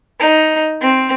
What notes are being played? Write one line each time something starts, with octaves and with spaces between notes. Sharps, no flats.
D#4
C4